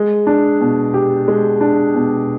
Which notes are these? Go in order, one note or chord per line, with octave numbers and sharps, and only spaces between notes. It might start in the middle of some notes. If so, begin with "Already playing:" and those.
Already playing: G#3
D4
B2
G4
G#3
D4
B2